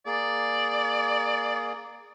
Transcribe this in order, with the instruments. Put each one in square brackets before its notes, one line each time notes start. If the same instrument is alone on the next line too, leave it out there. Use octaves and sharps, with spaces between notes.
[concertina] A#3 G#4 [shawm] D5